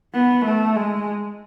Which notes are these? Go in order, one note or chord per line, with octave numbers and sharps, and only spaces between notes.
B3
A3
G#3